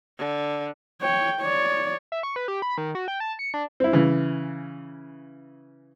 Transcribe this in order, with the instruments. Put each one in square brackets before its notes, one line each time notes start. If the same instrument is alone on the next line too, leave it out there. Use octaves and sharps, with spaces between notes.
[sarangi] D3
[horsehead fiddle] C#5 G5
C#5 D5
[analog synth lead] E5
C#6
B4
G4
B5
D#3
F#4
G5
A5
C#7
D4
[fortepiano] C4 E4
C#3 E3